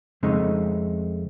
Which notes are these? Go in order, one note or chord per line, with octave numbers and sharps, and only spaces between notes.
F2 C#3 G#3 A3 C4 D#4